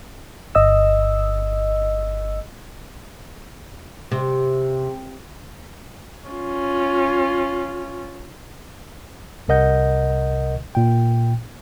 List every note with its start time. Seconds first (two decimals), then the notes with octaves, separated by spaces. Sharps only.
0.55 G1 D#5 E6
4.12 C3
6.28 C#4 F4
9.48 C2 C3 A#4 D#5 F#5 G6
10.75 A#2 G5